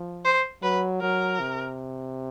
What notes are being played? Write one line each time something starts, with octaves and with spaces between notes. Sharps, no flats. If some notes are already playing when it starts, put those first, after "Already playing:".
Already playing: F3
C5
F#3 B4
F#3 A#4
C3